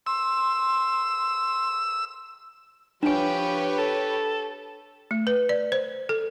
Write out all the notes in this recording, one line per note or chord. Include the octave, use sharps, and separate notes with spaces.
C6 E6
F3 D4 G4 B4 C#5 G#5
A4
A3
B4
D5
C5
A4